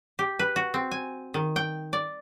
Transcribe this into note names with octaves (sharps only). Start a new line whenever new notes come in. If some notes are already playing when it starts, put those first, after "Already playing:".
G4
B4
F#4
C4
G#5
D#3
G5
D5